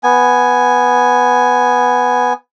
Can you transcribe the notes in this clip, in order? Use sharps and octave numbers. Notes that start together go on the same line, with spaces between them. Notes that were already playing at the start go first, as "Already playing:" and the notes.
B3 G#5